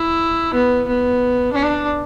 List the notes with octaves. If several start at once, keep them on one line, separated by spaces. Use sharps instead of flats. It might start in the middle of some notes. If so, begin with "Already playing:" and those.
Already playing: E4
B3
B3
D4